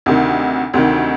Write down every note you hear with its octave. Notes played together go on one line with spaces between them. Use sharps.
D2 C3 D#3
D2 C3 D#3